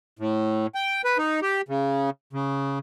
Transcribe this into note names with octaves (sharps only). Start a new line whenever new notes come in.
A2
G5
B4
D#4
G4
C#3
C#3